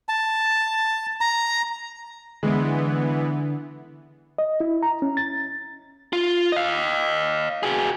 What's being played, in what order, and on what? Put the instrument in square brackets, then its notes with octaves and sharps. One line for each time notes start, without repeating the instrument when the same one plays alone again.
[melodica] A5
A#5
[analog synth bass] D3 [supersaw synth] E3 B3 [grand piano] G#3
[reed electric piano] D#5
E4
A#5
C#4
A6
[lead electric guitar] F4
D#5 F5
F#4 G#4